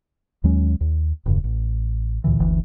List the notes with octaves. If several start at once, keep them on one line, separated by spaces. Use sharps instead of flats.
D#2 F#3 G#3 C#4
D#2
D#1 F#2 C#3
A1
D2 A#2 D3 E3
F#1 D2 E3